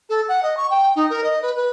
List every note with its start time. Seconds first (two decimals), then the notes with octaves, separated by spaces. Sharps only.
0.09 A4
0.28 F#5
0.42 D#5
0.56 C#6
0.70 G5
0.95 D#4
1.09 A#4
1.23 D#5
1.42 B4
1.55 B4